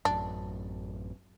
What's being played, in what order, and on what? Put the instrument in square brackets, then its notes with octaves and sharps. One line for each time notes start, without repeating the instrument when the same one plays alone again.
[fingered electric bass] A1 F#2 [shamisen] D4